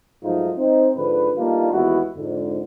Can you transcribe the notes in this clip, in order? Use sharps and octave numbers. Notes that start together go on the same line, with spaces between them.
G#2 F3 F#3 A3 D#4 F4
C4 D#4
G#2 D3 F3 B4
G3 A3 A#3 D4 D#4 F4
D#2 E3 G#3 B3 E4 F#4
F2 G#2 D3